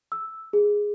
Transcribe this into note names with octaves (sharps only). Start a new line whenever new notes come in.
E6
G#4